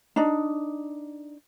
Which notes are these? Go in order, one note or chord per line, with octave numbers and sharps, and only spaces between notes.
D4 D#4